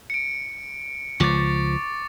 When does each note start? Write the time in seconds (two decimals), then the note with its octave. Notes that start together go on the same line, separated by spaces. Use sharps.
0.10 C#7 D7
1.20 C#2 F3 C#6 D6 A6